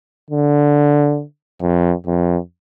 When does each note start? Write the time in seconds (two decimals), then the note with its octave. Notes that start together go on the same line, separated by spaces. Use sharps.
0.31 D3
1.62 F2
2.07 F2